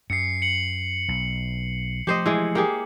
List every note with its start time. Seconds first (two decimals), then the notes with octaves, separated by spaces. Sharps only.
0.10 F#2 C7 C#7
0.42 C#7 F#7
1.08 B1
2.07 F3 A3 G4 C5 D#5
2.26 E3 G#3
2.55 A#3 G4 G#4